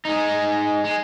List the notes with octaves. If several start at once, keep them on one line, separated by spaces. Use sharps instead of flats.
G#3 D#4
G#3